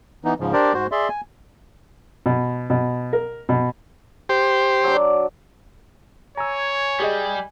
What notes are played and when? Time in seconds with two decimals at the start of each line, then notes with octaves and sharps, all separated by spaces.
0.25 E3 B3 D#4
0.40 G#2 C#3 F3
0.53 D4 G4 A#4 C5 D5
0.74 G#2 F#4 C5
0.92 G#4 D5 E5 C6
1.09 G#5
2.26 B2
2.70 B2
3.13 A#4
3.49 B2
4.29 G4 C5
4.84 F#3 D4
6.37 C#5 G#5 A#5 E6
7.00 G3 G4 G#4 D#5